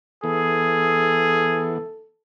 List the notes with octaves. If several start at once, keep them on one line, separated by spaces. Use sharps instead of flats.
E3 B3 G#4 A4